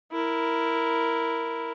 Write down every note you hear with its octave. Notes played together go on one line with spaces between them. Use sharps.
E4 A#4